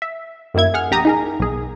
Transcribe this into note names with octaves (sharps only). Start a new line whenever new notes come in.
E5
F#2 D#3 A#3 E4 G#6
G#4 F#5 F6
A#1 G4 A#5 D#6
D#4 G#4 A#4
B1 G#4